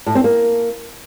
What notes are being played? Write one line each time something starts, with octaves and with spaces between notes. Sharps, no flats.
A2
C4
A#3